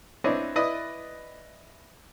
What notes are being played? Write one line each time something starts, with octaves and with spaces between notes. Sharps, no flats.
C4 D4 E4 B4 C#5 D#5
E4 B4 D5 D#5 D#6